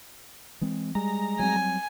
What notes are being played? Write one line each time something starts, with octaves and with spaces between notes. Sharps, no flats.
E3 G#3 C4
G3 G#3 A#5
F#3 G3 C4 G#5